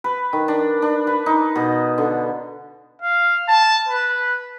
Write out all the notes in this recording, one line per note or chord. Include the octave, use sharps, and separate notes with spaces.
B4
D#3
D4
D4
B4
D#4
B2
D3
F5
A5
B4